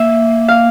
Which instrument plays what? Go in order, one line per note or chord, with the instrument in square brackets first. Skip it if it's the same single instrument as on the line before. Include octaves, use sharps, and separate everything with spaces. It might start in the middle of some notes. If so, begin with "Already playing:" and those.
Already playing: [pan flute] A#3 [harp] E5
[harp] F5